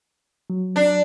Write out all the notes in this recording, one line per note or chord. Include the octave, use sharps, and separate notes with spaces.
F#3
D4